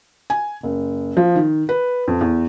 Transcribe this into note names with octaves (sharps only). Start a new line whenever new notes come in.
G#5
F#1
F3
D#3
B4
F2
E2